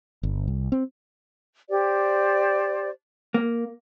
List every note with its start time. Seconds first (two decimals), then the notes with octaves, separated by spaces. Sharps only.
0.23 G1
0.48 C2
0.72 C4
1.69 G4 C5 D5
3.34 A#3